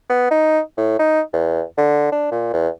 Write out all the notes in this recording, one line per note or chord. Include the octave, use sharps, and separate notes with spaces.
B3
D#4
A2
D#4
E2
D3
D4
A#2
E2